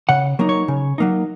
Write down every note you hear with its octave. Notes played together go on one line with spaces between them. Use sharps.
C#3 F#5
F#3 A#3 D#4
C#5
C#3
F#3 A#3 D#4